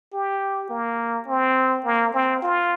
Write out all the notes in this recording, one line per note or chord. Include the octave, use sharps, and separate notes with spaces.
G4
A#3
C4
A#3
C4
F4